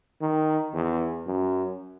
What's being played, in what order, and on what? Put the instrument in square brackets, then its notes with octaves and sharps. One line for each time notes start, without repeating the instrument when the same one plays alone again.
[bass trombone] D#3
E2
F#2